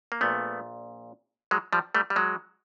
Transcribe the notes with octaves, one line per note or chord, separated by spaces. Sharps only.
A#3
A#1 A#2 A3 B3
F#3 G#3
F3 G3
G3 A3
G3
F#3 G#3